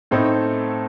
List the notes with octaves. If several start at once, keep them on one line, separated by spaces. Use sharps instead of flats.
A2 A3 C4 D#4 A4